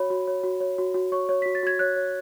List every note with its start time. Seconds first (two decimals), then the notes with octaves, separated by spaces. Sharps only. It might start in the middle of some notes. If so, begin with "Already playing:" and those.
Already playing: F#4 C#5 B5
0.10 F#4
0.27 C#5
0.43 F#4
0.60 C#5
0.78 F#4
0.94 F#4
1.12 C#5 C#6
1.29 C#5
1.42 F#4 B6
1.55 A6
1.63 F#4 G#6
1.79 C#5 F#6
1.96 C#5